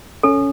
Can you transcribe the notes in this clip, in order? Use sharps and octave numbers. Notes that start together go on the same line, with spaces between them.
C#4 A4